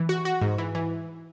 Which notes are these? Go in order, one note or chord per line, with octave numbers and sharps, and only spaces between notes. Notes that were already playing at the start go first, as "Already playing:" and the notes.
Already playing: E3
F#4
F#4
G#2
E3
E3